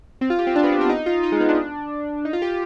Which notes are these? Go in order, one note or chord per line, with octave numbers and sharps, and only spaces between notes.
C4
F4
G4
C4
D4
B3
C4
D4
D#4
F4
D#4
G#3
B3
D4
D#4
F4
G4